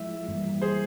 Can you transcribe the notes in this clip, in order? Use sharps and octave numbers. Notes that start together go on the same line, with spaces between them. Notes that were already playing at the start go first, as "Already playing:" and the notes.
Already playing: F3 G#3 E4 E5
G2 E3 G3 A#3
G#4 C5